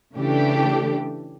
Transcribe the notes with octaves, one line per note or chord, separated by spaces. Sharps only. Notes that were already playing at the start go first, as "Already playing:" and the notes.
C#3 E3 A3 D4 G4